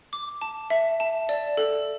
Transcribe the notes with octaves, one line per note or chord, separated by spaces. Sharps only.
D6
A5
E5
A5
D5
A4